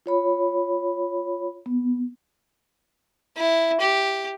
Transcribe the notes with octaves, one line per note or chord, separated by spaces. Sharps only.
F4 C#5 B5
B3
E4
G4